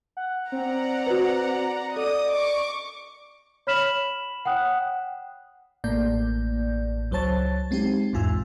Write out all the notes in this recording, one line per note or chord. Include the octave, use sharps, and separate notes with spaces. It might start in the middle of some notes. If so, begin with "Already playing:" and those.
F#5
C4 D5 F#5 A#5
F#4 B4
A4 D5 D#5 D#6
C#6 D6
C#5 B5 F6 B6 E7 F#7
F#5 G5 D#6 F#6
A1 A2 A#3 D5 G6
C#2 F#3 C5 C#5 A5 A6
G#3 C4 D#4 G4
B1 E2 G#2 F4 G#5 E6